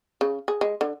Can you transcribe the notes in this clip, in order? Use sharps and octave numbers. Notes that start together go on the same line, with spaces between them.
C#3
G#4
G#3
D3